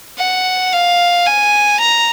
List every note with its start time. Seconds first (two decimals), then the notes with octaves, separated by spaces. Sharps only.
0.19 F#5
0.73 F5
1.26 G#5
1.80 A#5